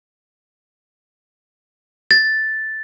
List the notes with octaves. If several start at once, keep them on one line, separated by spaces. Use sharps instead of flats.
A6